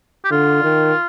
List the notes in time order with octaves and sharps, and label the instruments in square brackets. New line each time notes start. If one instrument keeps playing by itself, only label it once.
[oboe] G4
[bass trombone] D3 [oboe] F4
[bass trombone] D#3